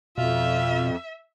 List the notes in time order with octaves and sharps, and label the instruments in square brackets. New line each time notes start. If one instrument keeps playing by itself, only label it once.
[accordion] F2 [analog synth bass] B2 [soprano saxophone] F4 [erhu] E5